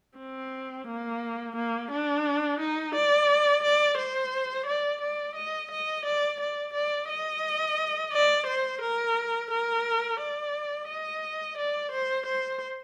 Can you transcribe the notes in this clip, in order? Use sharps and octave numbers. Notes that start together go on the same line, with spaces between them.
C4
A#3
A#3
D4
D#4
D5
D5
C5
D5
D5
D#5
D#5
D5
D5
D5
D#5
D5
C5
A#4
A#4
D5
D#5
D5
C5
C5